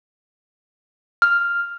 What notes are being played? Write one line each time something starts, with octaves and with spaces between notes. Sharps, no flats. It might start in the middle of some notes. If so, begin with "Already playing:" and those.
F6